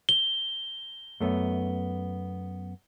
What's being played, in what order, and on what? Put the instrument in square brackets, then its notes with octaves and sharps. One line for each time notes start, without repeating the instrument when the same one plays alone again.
[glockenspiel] G7
[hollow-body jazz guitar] F#2 A3 B3